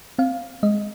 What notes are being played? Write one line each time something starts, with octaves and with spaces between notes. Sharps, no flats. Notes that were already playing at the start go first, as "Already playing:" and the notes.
C4 F5
G#3 D#5